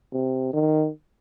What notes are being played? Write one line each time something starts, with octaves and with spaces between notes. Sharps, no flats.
C3
D#3